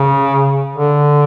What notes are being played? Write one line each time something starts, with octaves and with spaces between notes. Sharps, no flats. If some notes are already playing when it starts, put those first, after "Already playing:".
Already playing: C#3
D3